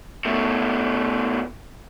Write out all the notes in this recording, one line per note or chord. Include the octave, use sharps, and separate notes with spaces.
B2 A3